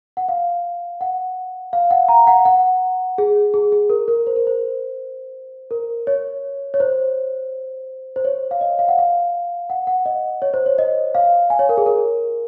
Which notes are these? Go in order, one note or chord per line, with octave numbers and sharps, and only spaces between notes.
F#5
F5
F#5
F5
F#5
A#5
F#5
F#5
G#4
G#4
G#4
A#4
A#4
C5
A#4
C5
A#4
C#5
C#5
C5
C5
C#5
F5
D#5
F5
F#5
F5
F#5
F#5
D#5
C#5
C5
C#5
D#5
F5
G#5
C#5
A#4
G#4
A#4